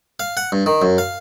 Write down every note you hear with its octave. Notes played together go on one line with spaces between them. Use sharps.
F5
F#5
G2
D#3
F#2
F5